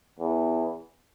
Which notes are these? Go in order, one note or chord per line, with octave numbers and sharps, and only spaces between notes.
E2